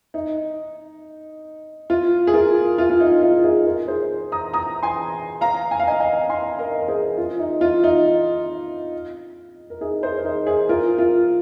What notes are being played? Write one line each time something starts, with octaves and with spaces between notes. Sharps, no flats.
D#4
F4
G#4
F4 A#4
F4
F4
D#4
F4
D#4 G#4
F4 A#4
G#4 C5
A#5 D#6
A#5 D#6
G#5 C6
F5 A#5
G#5
F5
D#5 G#5
D#5 G#5
G#5 C6
A#4 D#5
A#4
G#4 C5
F4
D#4
F4
D#4
A#4
D#4 G#4
G#4 C5
A#4
D#4 G#4
G#4 C5
F4 A#4
F4